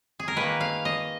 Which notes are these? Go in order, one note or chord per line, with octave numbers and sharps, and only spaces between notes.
G#4
A#4
D#3 A#3 B4
F5
D#5